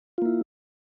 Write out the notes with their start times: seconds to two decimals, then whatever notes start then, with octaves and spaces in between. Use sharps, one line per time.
0.18 F4
0.22 A#3
0.26 E4